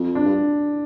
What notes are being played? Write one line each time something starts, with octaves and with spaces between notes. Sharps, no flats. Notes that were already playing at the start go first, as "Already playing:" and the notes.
Already playing: F2
D4
G2